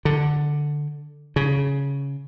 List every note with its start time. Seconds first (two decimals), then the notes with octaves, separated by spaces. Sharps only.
0.05 D3
1.36 C#3